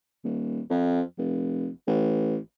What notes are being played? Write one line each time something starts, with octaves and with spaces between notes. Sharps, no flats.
D#1
F2
F1
A1